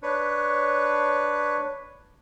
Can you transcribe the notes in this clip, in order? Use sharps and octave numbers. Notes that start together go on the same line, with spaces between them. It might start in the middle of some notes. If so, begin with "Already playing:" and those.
D4 B4 C#5